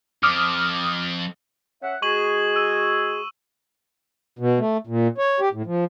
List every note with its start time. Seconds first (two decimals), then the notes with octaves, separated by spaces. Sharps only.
0.23 F2 D6 D#6 F6
1.82 C#4 E5 F#5
2.02 G#3 F#4 G#4 C#6 D#7 F#7
2.56 E6 D#7
4.39 B2
4.59 A3
4.87 A#2
5.18 C#5
5.40 G4
5.53 A2
5.66 F3